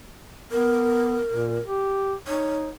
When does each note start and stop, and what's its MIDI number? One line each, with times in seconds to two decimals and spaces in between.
0.52 1.20 59
0.52 1.62 70
1.31 1.59 46
1.66 2.14 67
2.27 2.72 63
2.27 2.67 73